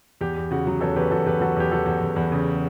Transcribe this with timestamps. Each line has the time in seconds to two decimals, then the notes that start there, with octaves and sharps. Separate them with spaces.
0.21 E2 G4
0.37 E2
0.51 C#3 F#4
0.67 F#3
0.81 E2 A4 C#5
0.96 E2 G4 B4
1.11 E2 F#4 A4
1.26 E2 G4 B4
1.41 F#3 F#4 A4
1.57 E2 G4
1.72 E2 F#4 A4
1.86 E2
2.01 E2
2.16 E2
2.32 C#3